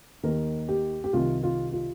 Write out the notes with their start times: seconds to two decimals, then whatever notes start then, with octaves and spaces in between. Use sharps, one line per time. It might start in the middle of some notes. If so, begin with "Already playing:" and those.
0.23 D#2 D#3 A#4
0.69 G4
1.04 G4
1.13 C2 C3 D#3 F4
1.43 F4
1.73 F4